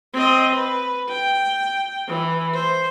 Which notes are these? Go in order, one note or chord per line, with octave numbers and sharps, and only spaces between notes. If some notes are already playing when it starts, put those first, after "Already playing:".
C4 D#5
B4
G5
E3
C5